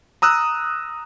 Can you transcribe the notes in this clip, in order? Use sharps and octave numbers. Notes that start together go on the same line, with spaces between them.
A#5 D#6 E6 F#6